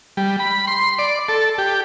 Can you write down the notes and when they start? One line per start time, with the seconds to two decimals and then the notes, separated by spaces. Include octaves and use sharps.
0.17 G3
0.39 B5
0.67 C6
0.99 D5
1.29 A4
1.58 G4